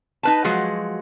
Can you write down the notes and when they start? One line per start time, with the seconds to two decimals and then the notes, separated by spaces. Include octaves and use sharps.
0.23 D#4 B4 A5
0.44 F3 F#3 G#3 F#4